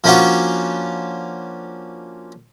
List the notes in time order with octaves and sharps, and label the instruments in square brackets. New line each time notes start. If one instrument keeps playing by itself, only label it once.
[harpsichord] F3 A#3 C#4 D4 F4 F#4